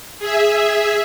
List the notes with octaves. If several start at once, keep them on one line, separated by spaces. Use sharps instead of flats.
G#4 E5